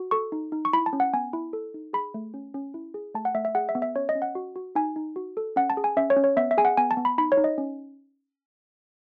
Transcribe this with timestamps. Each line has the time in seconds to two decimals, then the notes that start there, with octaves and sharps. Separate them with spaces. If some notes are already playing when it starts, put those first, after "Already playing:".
Already playing: F#4
0.11 A4 C#6
0.32 D#4
0.52 D#4
0.65 C#6
0.73 E4 B5
0.86 A5
0.93 C#4
1.00 F#5
1.13 B3 G#5
1.33 E4
1.53 A4
1.74 D#4
1.93 G#4 B5
2.14 A3
2.34 C#4
2.54 C#4
2.74 E4
2.94 G#4
3.14 A3 A5
3.25 F#5
3.34 A3 E5
3.45 E5
3.55 G#4 F#5
3.69 E5
3.75 B3
3.82 E5
3.95 C#4 C#5
4.09 D#5
4.15 C#4
4.22 F#5
4.35 F#4
4.56 F#4
4.75 D#4 G#5
4.96 D#4
5.16 F#4
5.37 A4
5.56 C#4 F#5
5.70 A5
5.77 G#4
5.84 G#5
5.97 C#4 E5
6.10 C#5
6.17 C#4
6.24 C#5
6.37 B3 E5
6.51 E5
6.58 G#4 G#5
6.65 F#5
6.77 B3 G#5
6.91 A5
6.97 B3
7.05 B5
7.18 D#4 B5
7.32 C#5
7.37 D#4
7.44 D#5
7.58 C#4